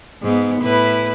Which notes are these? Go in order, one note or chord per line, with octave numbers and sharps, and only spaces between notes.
G#2 B3
A2 E4 B4